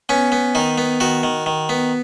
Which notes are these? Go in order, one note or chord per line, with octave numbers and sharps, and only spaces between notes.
B3 C#4
B3
D#3 D#4
B3
D#3 F#4
D#3
D#3
B3